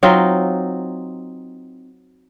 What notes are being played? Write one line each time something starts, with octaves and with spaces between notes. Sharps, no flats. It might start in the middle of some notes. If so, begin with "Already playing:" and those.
F#3 C4 D#4 F4